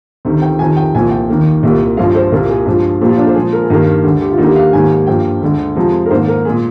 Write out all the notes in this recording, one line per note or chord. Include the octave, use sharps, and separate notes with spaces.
D2 C3 D#3
G5
F2 C3 D#3 G#5
G5
C2 A#2 F3 G#5
G5
D#2 D#3 A#3
C2 A#2 G3 A#3
G2 F3 G#3 F5
C5
C2 A#2 G3 A#3 A#4
G#4
G2 F3 G#3
A#2 F3 A#3 G4
F4
D4
C5
A#2 F3 G#3 G#4
A#4
G#4
G2 D#3 G3 A#3 A#4
D2 D3 G#3 G4
G4
F4
D#2 D3 G3 A#3 D#4
G4
F5
G#2 D#3 G3 A#3 G#5
G2 F3 A#3 G5
D2 D3 G#3
F2 C3 F3 G#3
A#4
G#2 D#3 A#3 C5
A#4
A#2 G#3 G#4